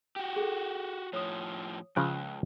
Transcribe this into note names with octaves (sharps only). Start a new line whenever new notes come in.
F#4 G4
G#4 A4
A2 F3 C#5 D#6
C#2 C#3 F3 G5 F#6